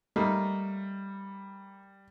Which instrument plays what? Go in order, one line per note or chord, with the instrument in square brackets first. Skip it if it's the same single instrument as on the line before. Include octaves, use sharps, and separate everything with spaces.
[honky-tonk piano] G3 [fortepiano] A3 A#3 D#4